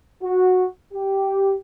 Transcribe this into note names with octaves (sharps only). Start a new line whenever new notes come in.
F#4
G4